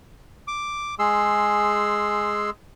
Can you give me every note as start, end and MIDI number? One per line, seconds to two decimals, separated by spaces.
0.48 0.95 86
0.99 2.50 56
0.99 2.50 68
0.99 2.50 84
0.99 2.50 88